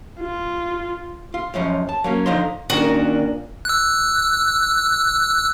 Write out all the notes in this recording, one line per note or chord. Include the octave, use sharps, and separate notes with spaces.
F4
F4
C#2 F#2 F3 C#4
A5
F#3 A#3 C#4
D3 F3 D#4 A#5 C6
A#2 D#3 C#4 D4 F#4 A#4
E6 F#6